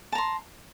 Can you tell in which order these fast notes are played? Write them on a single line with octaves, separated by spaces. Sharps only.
A5 A#5 C6